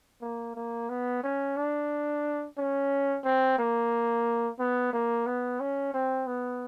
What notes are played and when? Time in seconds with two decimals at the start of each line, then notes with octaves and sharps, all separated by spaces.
0.21 A#3
0.55 A#3
0.89 B3
1.23 C#4
1.57 D4
2.58 C#4
3.24 C4
3.58 A#3
4.59 B3
4.93 A#3
5.26 B3
5.60 C#4
5.94 C4
6.27 B3